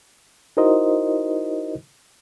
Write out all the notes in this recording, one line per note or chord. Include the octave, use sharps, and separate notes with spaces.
D#4 E4 F#4 A#4 C5 D#5